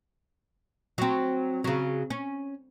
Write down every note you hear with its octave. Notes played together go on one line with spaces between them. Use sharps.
F#3 C4
C#3 F#3
C#4